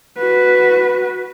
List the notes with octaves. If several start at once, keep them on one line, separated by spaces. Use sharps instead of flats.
F#4 B4